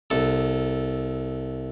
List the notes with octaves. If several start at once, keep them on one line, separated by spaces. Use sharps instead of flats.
C2 A4